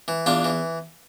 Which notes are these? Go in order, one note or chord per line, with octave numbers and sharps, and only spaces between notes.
E3
E2 D4 F4
E3